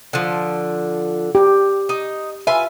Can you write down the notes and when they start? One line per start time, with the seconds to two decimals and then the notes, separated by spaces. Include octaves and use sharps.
0.13 D3 F3
1.35 G4
1.89 D#4
2.47 F4 B4 E5 G#5